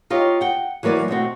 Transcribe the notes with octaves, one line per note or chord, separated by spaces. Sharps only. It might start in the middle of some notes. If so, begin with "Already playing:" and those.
D#4 F4 G4 C#5
F#5 G5
E3 F#3 A#3 B4 D5
B2 A3 C4 F#4